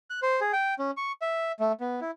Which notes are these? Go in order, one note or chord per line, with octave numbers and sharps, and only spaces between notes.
F#6
C5
G#4
G5
C#4
C#6
E5
A3
B3
E4